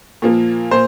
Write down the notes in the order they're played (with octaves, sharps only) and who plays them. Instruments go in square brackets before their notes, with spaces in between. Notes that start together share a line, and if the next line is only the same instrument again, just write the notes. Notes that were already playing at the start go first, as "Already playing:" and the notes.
[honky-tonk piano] A#2 F3 A#3
A#2 C5